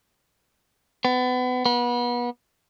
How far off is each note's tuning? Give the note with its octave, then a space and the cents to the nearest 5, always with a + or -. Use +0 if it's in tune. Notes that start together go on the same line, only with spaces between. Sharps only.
B3 +30
B3 -30